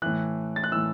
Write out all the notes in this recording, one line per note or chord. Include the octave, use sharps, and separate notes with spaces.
A2 E3 F#6
A6
F#6
A2 E3 E6